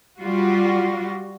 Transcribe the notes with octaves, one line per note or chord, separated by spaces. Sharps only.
G3 F4 F#4